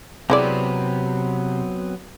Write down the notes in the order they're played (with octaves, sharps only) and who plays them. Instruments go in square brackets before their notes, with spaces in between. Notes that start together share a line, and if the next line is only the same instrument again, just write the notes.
[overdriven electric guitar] C3 [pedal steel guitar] F#3 B3 C4 [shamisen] G#3 E4 D5